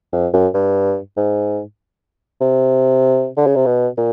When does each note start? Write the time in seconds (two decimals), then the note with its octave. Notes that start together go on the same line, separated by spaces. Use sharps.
0.13 F2
0.33 F#2
0.54 G2
1.17 G#2
2.41 C3
3.37 D3
3.47 C#3
3.56 C3
3.66 B2
3.98 A#2